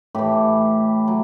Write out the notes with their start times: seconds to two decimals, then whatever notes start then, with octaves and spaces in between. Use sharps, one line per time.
0.15 A2 E3 G4
1.08 F#3